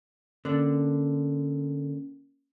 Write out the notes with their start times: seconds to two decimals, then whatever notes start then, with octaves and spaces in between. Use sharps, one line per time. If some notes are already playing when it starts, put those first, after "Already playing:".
0.45 D3 A#3 C#4 D4 A#4